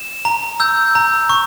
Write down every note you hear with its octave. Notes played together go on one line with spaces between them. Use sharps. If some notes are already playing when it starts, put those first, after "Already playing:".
Already playing: E7
A#5
E6 G6
A#5
C#6